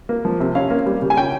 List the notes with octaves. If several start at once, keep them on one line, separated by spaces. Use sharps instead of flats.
A#3
F3
C3
C#4 F5
A#3
G3
C#3
G#5
C#4 G5